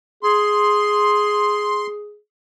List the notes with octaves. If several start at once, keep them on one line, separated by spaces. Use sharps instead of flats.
G#4 C6